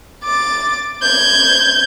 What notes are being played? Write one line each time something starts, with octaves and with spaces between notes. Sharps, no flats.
D6 A6
G6 G#6